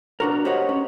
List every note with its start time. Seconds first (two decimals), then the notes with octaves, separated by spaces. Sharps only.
0.20 D4 F#4 A#4
0.45 G4 A#4 C5 C#5 D#5 F#5
0.69 C#4